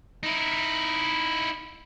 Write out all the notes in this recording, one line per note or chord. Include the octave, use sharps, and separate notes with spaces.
D#4 E4